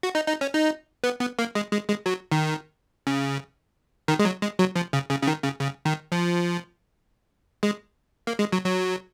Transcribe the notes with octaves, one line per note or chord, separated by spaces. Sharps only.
F#4
D#4
D#4
C#4
D#4
B3
B3
A#3
G#3
G#3
G#3
F#3
D#3
C#3
D#3
G#3
F#3
G#3
F#3
F3
C#3
C#3
C#3
D#3
C#3
C#3
D#3
F3
G#3
A#3
G#3
F#3
F#3